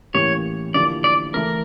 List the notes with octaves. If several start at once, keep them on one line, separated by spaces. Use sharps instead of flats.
A2 E3 A#3 C#4 G4 C#5
D3 F3 A#3 E4 G4 D5
D5
E3 A3 E4 A4 A#4